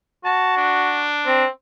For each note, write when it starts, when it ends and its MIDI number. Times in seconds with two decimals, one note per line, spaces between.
0.25 1.08 66
0.25 0.53 81
0.57 1.44 62
1.26 1.47 60